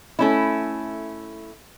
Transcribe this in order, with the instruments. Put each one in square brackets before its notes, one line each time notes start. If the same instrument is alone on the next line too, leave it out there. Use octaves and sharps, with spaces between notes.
[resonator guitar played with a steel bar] A3 C#4 E4